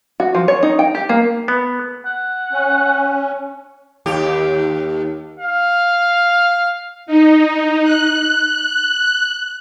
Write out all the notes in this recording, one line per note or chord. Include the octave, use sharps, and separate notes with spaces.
F#4
F3
C#5
D#4
G5
G4
A#3
B3
F#5
C#4
D#2 G4
F5
D#4
F#6